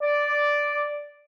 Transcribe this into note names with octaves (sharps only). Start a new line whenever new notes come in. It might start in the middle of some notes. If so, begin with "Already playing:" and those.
D5